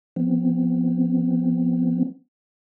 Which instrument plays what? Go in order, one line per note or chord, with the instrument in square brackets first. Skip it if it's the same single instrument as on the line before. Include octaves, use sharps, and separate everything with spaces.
[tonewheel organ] F3 B3 C4